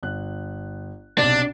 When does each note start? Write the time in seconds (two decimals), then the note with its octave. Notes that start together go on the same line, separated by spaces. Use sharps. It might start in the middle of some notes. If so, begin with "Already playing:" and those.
0.03 G1 F#6
1.18 B1 C3 D4